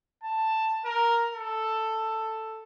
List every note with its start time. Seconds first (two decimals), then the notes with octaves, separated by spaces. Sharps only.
0.23 A5
0.85 A#4
1.34 A4